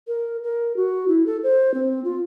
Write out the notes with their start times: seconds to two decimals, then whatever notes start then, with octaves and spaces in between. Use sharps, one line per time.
0.07 A#4
0.43 A#4
0.76 F#4
1.08 E4
1.26 A4
1.43 C5
1.74 C4
2.04 F4